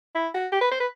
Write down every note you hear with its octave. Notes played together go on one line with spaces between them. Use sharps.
E4
F#4
G4
B4
C5
B4